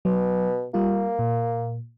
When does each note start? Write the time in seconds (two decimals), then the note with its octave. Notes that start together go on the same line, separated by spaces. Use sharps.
0.05 B2 F#3
0.74 G3 A#3 F4
1.19 A#2